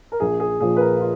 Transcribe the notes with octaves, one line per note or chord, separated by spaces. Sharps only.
A#4
A#1 G#4
G#4
A#2 F3 G#4
B4
A#4
F4